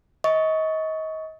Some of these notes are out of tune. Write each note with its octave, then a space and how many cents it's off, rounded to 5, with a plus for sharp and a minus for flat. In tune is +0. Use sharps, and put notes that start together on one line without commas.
D#5 +30 C#6 +10